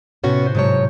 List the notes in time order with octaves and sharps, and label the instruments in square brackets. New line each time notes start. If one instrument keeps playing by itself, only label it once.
[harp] A2 C3 [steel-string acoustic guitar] B3 C#4 F#4
[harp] B4 C5
[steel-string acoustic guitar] G#2 F#3 C#5 [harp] C3 A5 E7